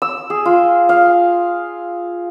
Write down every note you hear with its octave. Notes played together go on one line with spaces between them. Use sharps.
E6
G#4
F4
F5